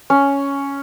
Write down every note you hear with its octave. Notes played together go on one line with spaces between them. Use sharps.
C#4